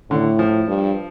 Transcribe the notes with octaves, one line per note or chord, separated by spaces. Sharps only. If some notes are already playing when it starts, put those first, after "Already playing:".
A2 D3
F3
G2